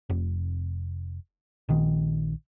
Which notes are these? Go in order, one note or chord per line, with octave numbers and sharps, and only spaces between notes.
F1
A#1 D#3